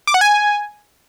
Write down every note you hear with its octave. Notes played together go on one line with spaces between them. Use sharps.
D6
F#5
G#5